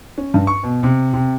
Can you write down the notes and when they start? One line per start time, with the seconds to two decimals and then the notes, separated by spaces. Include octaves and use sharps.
0.18 C#4
0.34 G2
0.47 C#6
0.64 B2
0.83 C3
1.13 C3